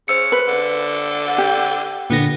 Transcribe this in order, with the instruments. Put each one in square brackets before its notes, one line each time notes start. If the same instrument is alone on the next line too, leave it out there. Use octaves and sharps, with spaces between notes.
[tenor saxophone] C#3 [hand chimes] C5 E6 C#7
[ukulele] B4
[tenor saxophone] D3
[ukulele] G4
[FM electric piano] A#2 D3 A#6 [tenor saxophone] B3